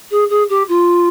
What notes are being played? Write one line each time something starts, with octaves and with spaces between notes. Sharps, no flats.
G#4
G#4
G4
F4